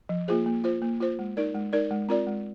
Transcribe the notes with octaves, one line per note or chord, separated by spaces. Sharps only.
F3
A#3 F4 G#4 C5
A#3
F4 C5
A#3
F4 C5
G#3
D#4 A#4 D5
G#3
D#4 A#4 D5
G#3
C4 F4 A#4 D5
G#3